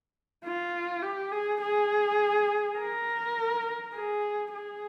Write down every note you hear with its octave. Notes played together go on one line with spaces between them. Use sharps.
F4
G4
G#4
G#4
A#4
G#4
G#4